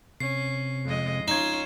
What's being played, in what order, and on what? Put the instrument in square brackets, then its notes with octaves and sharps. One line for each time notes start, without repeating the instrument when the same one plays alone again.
[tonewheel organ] C3 [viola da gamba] C#4 [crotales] C7
[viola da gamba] F2 G#3 D#5
[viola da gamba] C#4 F4 [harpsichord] D#4 [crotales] G#6 E7